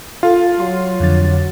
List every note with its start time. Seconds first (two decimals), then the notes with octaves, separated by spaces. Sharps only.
0.23 F4 A4 F5
0.60 F#3 C6
1.00 F2 D3 A6